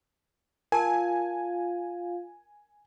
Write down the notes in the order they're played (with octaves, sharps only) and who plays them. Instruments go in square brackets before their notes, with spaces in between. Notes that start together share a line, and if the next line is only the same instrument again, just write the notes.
[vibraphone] F4 F5 [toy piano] A#4 A5 [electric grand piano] G#5